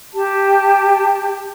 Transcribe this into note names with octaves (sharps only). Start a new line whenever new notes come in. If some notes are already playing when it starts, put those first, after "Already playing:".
G4 A5